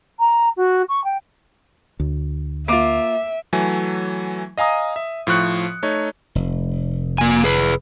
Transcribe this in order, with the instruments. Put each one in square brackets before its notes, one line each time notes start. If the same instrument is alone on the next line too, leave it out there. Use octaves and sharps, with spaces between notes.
[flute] A#5
F#4
C#6
G5
[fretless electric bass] D2
[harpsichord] A#3 F4 [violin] E5 [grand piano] D6 D7
[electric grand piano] E3 F#3 A3 G#5
D#5 F5 G#5 A#5 D#6
E5
A2 F3 C#6 F#6 C#7
A3 D#4 C#5
[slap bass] F1
[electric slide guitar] A#3 G#5
G#4 B4